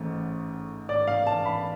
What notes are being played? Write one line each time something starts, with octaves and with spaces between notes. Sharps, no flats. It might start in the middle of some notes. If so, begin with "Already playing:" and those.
Already playing: A1 G#2 A3
D5
F5
A5
B5